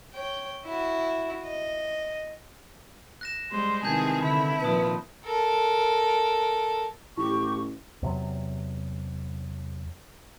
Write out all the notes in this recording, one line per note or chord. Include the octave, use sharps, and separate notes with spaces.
C#5 G5
E4 F#4
D#5
F#6 A#6 E7
G3 G#3 C5
C3 D#3 E3 G#4 A5 G6 G#6
D3 E4 B5
A#2 D#3 F3 B4 A5 D#6
A4 A#4
A1 E4 G4 C#6
E2 C3 F#3